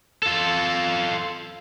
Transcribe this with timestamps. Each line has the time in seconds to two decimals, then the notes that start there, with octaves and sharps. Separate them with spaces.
0.23 F4 A4